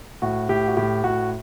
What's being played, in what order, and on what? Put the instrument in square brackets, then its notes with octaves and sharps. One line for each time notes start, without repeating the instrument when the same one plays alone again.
[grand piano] A2 F#4
A2 G4
F#4
A2 G4
A2 F#4